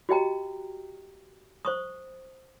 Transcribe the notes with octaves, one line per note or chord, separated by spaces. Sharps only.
F#4 G4 D#5 G5 A#5
C5 C#6 D#6